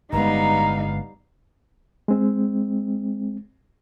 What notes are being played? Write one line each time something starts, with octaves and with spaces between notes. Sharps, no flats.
G1 D3 G3 G#3 B3 D#4 F5 A#5
G#3 C4